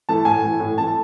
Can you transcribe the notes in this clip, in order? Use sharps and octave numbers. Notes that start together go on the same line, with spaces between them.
E3 A3 A5
A2 G#5
E3 A3
A2
E3 A3 A5
A5